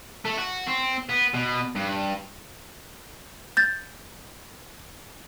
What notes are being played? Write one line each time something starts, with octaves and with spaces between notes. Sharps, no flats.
A3
F#4
C4
B3
B2
G2
G6 A6